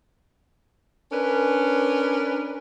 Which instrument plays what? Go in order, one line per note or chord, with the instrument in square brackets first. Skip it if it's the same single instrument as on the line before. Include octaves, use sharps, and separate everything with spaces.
[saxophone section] C#4 D4 A#4 B4